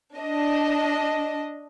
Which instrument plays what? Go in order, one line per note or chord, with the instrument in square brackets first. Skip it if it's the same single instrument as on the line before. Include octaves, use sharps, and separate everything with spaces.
[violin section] D4 D#5